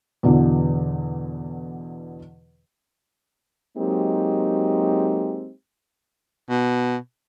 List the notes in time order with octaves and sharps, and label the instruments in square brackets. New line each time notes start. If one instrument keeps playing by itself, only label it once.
[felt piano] E2 B2 D3 E3
[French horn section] F#3 G#3 A#3 C4 D#4 G4
[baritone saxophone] B2